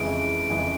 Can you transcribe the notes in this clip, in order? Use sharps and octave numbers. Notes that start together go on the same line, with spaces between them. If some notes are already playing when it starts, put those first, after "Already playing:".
Already playing: F2 C#3 E3 G#3 D7
F2 C#3 E3 G#3